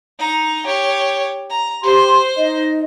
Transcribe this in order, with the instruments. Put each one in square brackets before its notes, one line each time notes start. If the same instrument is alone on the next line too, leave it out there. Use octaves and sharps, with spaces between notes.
[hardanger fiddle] D#4 A#5
G4 C#5
A#5
[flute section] G4 C6 [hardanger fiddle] C5
[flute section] D#4 D#5